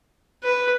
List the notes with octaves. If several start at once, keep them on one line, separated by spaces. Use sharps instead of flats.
B4